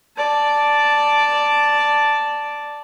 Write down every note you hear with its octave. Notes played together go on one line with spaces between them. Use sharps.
D5 A5